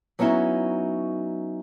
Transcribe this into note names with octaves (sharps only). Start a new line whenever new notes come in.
F#3 B3 C#4 D#4 E4 F#4